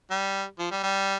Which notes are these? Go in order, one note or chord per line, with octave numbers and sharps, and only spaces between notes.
G3
F3
G3
G3